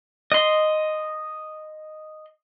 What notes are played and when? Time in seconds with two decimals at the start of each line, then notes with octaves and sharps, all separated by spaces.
0.32 D#5 C6